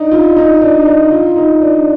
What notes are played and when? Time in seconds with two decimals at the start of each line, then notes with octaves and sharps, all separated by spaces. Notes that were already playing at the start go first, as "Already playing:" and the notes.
Already playing: D4 D#4
0.12 F4
0.37 D#4
0.62 D4
0.86 D#4
1.11 F4
1.36 D#4
1.61 D4